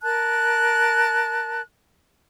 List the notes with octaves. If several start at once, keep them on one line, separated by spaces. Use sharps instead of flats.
A#4 A5 F#6